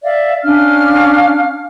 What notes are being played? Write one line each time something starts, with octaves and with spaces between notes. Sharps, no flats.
D5 E5 F5
C#4 D4 F5 F6